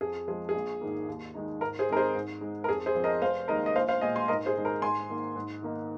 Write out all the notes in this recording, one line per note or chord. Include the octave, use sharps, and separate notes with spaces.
F2 G#4
F3 G#3 G#4
A#1 G#4
G#2 D#3 A#3
D#2
D#3 G#3 D#4
G#2 A#4
G#4 C5
D#3 G#3 C4 D#4 A#4
G#4 C5
G#2
G#3 D#4
A#4
F2 G#4
G#4 C5
F3 C4
A#4 D#5
F1 C5 F5
D#2 D#3 G#3 A#4 D#5
D#5
A#1 C5 F5
C5 F5
A#2 G#3 D#5 G#5
G#5 C6
G#2 A#4 D#5
G#4 C5
D#3 G#3 D#4
A#4
G#2 G#5 C6
D#3 A#3
G#2
D#3 A#3 D#4